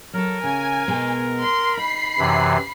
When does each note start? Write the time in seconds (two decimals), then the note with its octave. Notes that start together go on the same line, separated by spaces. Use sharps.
0.13 F#3 A4 A#4
0.44 C#3 G#5
0.88 B2 G#3 B3
1.41 C6
1.77 D#4 B5 C7
2.18 F#2 C3 E3